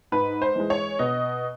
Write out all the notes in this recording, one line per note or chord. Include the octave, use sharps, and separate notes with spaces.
G#2 B4
C5
E3 G#3
C#5
B2 D#5